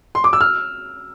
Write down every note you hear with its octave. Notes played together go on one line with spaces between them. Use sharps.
C6
D6
E6
F6